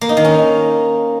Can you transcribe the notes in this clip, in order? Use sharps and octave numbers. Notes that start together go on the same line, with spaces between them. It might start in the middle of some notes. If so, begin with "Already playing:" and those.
A#3
D#4
D#3
C#4